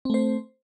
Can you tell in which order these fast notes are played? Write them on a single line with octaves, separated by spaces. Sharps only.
C4 A3 C5